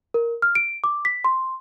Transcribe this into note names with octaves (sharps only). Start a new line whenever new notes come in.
A#4
F6
D7
D6
B6
C6